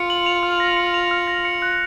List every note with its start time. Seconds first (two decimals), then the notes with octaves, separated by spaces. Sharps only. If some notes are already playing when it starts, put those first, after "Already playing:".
Already playing: F4 C#7
0.10 F#7
0.26 F7
0.43 F6
0.60 A#6
0.77 C#7
0.94 F7
1.11 F6
1.28 A#6
1.45 C#7
1.62 F#6